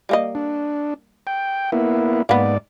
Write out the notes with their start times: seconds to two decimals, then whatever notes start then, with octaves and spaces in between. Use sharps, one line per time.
0.09 G3 A#3 D#5
0.35 D4
1.27 G5
1.72 A#3 B3 E4
2.29 G#2 A#3 B3 D5